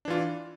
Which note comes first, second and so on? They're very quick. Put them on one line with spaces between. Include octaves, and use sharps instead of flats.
D4 E3 F4